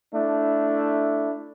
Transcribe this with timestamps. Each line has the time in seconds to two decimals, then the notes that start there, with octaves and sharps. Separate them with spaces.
0.13 A3 D4 E4